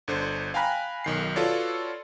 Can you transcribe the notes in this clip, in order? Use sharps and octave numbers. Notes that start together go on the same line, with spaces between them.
G1 D3 C5
F5 G5 G#5 A#5 B5 F#6
B1 D#3 C7
F4 F#4 A4 B4 C#5 D5